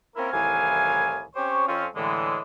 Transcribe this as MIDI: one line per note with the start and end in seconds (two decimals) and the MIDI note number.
0.16 0.32 58
0.16 0.32 60
0.16 0.32 61
0.16 0.32 64
0.16 0.32 70
0.33 1.23 36
0.33 1.23 45
0.33 1.23 51
0.33 1.23 52
0.33 1.23 77
0.33 1.23 80
1.35 1.65 60
1.35 1.65 61
1.35 1.65 67
1.35 1.65 72
1.35 1.65 73
1.68 1.86 41
1.68 1.86 60
1.68 1.86 61
1.68 1.86 65
1.96 2.40 45
1.96 2.40 50
1.96 2.40 52
1.96 2.40 56